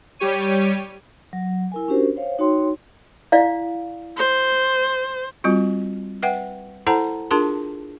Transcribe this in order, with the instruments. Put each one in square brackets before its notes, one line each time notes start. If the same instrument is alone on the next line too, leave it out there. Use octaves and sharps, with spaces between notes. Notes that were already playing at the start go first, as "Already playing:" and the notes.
[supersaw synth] G3 G4 C#5 D#7
[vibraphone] F#3
E4 A#4 G#5
C#4 D4 F#4 G4 A#4 C5
C5 C#5 F5
D#4 F#4 C#5 G5 C6
[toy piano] E4 D5 F5
[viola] C5
[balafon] G3 C4 F4 F#4
B4 E5 F#5 G5
E4 A4 C5 F#5 A5 A#5
D4 F4 G#4 A#4 A5 C6